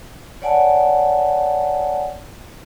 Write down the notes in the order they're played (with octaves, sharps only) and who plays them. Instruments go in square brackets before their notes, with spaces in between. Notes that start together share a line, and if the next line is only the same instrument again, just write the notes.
[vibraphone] C#5 D5 F#5 G#5 A5